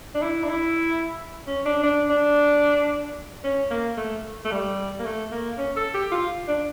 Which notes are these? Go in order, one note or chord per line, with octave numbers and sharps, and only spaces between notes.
D4
E4
D4
E4
C#4
D4
D4
D4
C#4
A#3
A3
A3
G3
A#3
A3
A#3
C#4
A4
G4
F4
D4